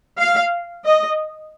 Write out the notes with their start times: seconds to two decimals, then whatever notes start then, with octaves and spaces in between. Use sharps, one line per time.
0.18 F5
0.84 D#5